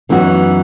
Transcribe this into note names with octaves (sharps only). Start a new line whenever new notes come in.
F#2 E3 B3 D#4 F#4